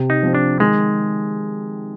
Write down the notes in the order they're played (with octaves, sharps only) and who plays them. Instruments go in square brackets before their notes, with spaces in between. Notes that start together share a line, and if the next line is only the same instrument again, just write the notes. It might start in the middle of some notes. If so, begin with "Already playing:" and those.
Already playing: [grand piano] C3
[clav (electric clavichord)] D#4
[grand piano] F3 C4
[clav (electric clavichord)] D4
[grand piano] D#3 [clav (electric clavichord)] G#3